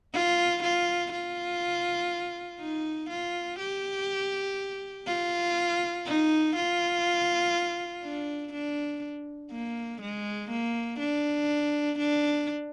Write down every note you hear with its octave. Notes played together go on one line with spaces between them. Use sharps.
F4
F4
F4
D#4
F4
G4
F4
D#4
F4
D4
D4
A#3
G#3
A#3
D4
D4